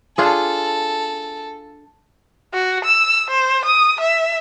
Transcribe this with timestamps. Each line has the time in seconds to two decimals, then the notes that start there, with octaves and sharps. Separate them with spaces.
0.18 D4 F4 G#4 A4
2.54 F#4
2.85 E6
3.31 C5
3.65 D#6
4.01 E5